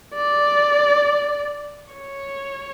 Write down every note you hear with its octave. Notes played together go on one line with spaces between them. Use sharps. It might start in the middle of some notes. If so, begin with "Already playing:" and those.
D5
C#5